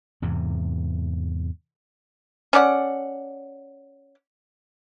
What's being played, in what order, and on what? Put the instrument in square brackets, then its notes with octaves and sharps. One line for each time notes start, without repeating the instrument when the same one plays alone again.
[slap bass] E2 G#2 C3
[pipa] C#4 A4 D5 F#5